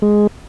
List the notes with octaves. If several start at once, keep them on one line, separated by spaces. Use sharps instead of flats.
G#3